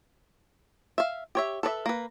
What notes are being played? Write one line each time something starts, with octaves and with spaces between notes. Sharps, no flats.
E5 F5
G4 C#5 E5
A4 B4 D5 E5
A#3 B4